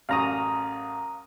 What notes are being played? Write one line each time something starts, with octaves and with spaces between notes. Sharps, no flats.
A1 F#2 F5 A#5 C#6 D#6